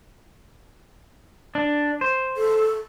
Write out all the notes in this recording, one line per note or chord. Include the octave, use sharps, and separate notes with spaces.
D4
C5
A4